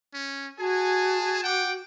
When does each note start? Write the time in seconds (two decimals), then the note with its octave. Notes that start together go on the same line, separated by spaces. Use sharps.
0.14 C#4
0.59 F#4 G#4 G#5 A5
1.44 F#5 G5 D6